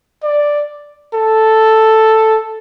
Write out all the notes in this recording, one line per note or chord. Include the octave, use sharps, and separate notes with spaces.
D5
A4